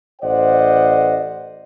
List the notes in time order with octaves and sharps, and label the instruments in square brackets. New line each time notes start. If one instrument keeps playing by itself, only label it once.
[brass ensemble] A1 C5 D5 D#5 F#5